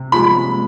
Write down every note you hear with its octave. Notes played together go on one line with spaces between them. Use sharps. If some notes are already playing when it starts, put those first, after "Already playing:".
Already playing: C3
F3 G#3 B5